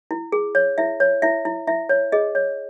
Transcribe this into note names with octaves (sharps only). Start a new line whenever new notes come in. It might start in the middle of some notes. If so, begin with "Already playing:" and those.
E4
G#4
C#5
E4 E5
C#5
E4 E5
E4
E4 E5
C#5
G#4 D#5
C#5